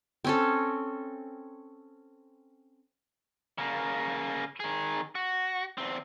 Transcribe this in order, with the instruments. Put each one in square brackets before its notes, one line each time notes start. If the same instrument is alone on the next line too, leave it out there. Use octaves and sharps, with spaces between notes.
[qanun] C4 C#4 A4
[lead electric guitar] C#3 A#3
D#3 G#4
F#4
E2 C4